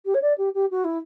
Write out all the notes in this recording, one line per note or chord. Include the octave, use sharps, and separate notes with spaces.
G4
C#5
D5
G4
G4
F#4
E4